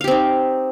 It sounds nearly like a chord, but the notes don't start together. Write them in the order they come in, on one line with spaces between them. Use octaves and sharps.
F5 G4 C4 D#4